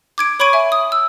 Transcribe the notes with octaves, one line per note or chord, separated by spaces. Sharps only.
D6 G#6 D7
C#5 B5 C#6 G#6 D7 D#7
E5 G#5
D#6
E6